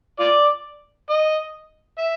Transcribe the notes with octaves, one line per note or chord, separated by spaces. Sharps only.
F4 D5
D#5
E5